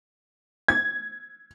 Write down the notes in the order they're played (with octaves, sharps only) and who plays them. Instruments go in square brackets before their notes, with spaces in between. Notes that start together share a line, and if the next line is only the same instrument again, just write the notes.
[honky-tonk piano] G#6